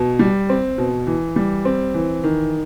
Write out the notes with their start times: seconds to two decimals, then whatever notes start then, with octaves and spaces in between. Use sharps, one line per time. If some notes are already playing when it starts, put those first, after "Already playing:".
Already playing: B2
0.19 G3
0.49 C4
0.78 B2
1.07 E3
1.36 G3
1.65 C4
1.94 E3
2.24 D#3